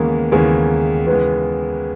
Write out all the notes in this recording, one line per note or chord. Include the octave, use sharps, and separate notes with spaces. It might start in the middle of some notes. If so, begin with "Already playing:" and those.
Already playing: D#2 C#3 E3 G#3 A#3 B3
D#2 C#3 E3 G#3 B3 G#4
D#2 C#3 E3 G#3 B3 B4